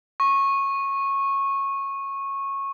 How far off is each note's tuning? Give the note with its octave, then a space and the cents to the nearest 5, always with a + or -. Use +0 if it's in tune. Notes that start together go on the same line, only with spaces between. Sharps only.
C#6 -15